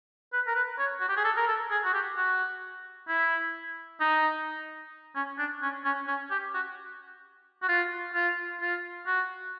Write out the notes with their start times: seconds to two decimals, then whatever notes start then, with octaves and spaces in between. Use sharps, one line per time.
0.33 B4
0.47 A#4
0.55 B4
0.79 C#5
1.00 F#4
1.08 G4
1.17 G#4
1.24 A4
1.37 A#4
1.48 A4
1.71 G#4
1.84 F#4
1.93 G4
2.17 F#4
3.08 E4
4.01 D#4
5.16 C#4
5.39 D4
5.62 C#4
5.85 C#4
6.07 C#4
6.30 G4
6.54 F#4
7.62 F#4
7.69 F4
8.15 F4
8.61 F4
9.06 F#4